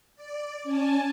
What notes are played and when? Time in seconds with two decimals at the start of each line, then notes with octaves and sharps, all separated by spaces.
0.16 D5
0.64 C#4 G#5 A5